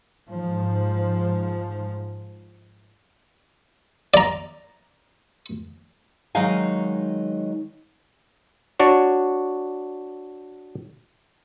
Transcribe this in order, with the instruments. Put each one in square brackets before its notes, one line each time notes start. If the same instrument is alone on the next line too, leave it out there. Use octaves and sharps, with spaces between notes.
[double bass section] G#2 F3
[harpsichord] D5 A#5
[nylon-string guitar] D#3 F#3 G#3 D#4 F5 G#5
[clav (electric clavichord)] D4 F#4 C#5